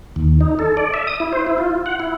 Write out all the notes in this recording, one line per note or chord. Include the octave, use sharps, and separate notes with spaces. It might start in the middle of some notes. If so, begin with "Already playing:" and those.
D#2
D#4
A4
D5
E5
D#6
E4
C5
E4
F4
F#5
E4